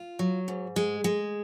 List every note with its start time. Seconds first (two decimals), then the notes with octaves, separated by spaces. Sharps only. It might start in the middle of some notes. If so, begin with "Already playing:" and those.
Already playing: F4
0.19 F#3
0.48 G#2
0.76 G#3
1.04 G#3